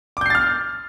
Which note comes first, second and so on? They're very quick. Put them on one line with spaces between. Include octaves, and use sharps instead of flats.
D6 G6 C7 A6 F6